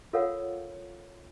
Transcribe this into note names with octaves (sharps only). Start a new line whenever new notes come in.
F4 A4 A#4 C#5 F5 F#5